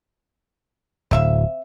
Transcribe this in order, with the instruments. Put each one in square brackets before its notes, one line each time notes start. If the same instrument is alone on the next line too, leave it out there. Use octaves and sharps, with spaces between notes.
[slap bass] D1 [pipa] C4 E5 F5